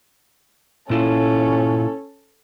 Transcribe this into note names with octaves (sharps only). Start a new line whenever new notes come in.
A#2 C#4 E4 F4 A4